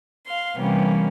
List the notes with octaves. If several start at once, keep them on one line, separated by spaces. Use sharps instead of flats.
F5 C6
C3 E3 G3 A#3 B3 C#4